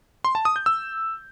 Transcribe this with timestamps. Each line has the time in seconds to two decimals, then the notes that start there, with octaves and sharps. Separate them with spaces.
0.24 C6
0.35 A5
0.45 D#6
0.56 G6
0.66 E6